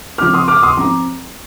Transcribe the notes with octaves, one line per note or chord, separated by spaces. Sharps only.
F3 C4 D#4 D6 F6
C6 D#6
D6 F6
C6 D#6
F3 C4 D#4 A#5 D6